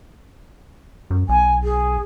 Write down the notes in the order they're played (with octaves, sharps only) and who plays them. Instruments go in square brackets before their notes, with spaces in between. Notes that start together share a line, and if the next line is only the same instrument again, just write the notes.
[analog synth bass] F#2
[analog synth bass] B1 [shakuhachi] G#5
[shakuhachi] G#4